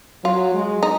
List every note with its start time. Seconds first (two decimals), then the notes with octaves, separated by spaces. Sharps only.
0.24 F#3 F4
0.54 G#3
0.83 D#4